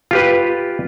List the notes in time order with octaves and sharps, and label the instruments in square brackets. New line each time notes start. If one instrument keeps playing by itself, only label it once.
[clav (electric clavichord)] F4 G4 B4